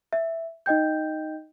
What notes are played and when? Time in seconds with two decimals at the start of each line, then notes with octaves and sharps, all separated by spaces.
0.13 E5
0.66 D#4 D#5 G5 G6